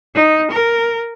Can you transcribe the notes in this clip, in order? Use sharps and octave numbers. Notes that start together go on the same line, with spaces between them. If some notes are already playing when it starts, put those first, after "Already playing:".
D#4
A#4